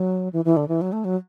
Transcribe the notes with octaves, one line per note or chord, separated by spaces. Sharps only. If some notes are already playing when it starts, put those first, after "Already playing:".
Already playing: F#3
E3
E3
D3
E3
F#3
A3
F#3